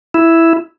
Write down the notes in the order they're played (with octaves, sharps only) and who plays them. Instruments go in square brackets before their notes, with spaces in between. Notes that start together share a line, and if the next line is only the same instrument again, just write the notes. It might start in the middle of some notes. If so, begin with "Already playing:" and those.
[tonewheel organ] E4